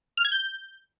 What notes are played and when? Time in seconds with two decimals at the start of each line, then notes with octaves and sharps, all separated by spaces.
0.17 F6
0.25 G#6
0.32 G6